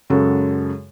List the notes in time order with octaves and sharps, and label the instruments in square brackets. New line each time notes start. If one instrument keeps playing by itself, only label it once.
[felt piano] F#2 C#3 G#3 F#4 A4